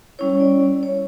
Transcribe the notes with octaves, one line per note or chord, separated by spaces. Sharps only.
G3 C#4 E4 C#5
C#5
D5
C#5